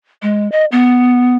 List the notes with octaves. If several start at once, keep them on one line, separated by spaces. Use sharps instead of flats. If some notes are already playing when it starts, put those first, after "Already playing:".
G#3
D#5
B3